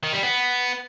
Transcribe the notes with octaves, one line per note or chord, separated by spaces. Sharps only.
D#3
G3
B3